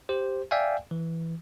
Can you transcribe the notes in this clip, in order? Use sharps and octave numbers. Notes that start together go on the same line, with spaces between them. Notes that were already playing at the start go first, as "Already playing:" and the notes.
G4 C5
D5 E5 F5 G5 G#5
E3